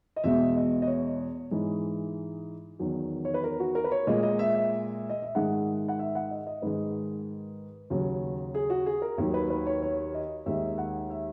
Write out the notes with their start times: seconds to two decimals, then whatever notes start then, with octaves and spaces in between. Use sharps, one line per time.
0.16 D#5
0.24 E2 B2 G#3 E5
0.56 D#5
0.82 D#5
0.87 C#5
1.51 G#2 E3 G#3
2.79 E2 D#3 F#3
3.25 C#5
3.34 B4
3.44 A#4
3.60 F#4
3.75 A#4
3.84 B4
3.92 C#5
4.07 A#2 G#3 D#5
4.23 D#5
4.39 E5
4.54 E5
5.10 D#5
5.22 E5
5.35 G#2 D#3 G#3 F#5
5.88 F#5
5.99 E5
6.15 F#5
6.31 D#5
6.47 D#5
6.62 G#2 D#3 G#3 B4
7.90 D#2 C#3 F#3
8.54 G#4
8.70 F#4
8.86 G#4
9.02 A#4
9.18 D#2 D#3 F#3
9.34 B4
9.50 B4
9.67 C#5
9.82 C#5
10.14 D#5
10.46 D#2 D#3 G#3 E5
10.78 F#5
11.10 E5